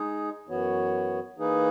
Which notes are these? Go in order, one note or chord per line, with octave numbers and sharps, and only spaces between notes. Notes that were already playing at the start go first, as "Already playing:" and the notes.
Already playing: G#3 D#4 G#4
F#2 E3 B3 F#4 C#5
E3 A#3 D#4 G#4 B4